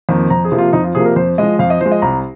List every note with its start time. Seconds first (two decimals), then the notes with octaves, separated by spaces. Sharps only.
0.09 F2 D#3 A#3
0.30 F2 A#5
0.45 G#4
0.52 C3 F3 A#3
0.58 F4
0.73 F2 D#4
0.84 F4
0.95 C3 F3 A#3 G#4
1.05 A#4
1.16 F2 C5
1.38 F3 G#3 D#5
1.59 F2 F5
1.70 D#5
1.81 F3 G#3 C5
1.92 D#5
2.02 C2 A#5